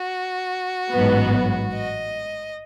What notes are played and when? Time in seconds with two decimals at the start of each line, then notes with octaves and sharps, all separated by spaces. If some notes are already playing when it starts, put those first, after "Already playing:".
Already playing: F#4
0.92 A1 G#2 F#3 B3
1.74 D#5